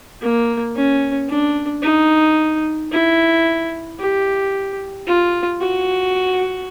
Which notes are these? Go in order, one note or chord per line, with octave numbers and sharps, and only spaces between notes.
A#3
C#4
D4
D#4
E4
G4
F4
F#4